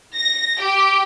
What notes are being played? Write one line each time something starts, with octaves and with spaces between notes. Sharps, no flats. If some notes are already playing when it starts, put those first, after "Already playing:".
A#6
G4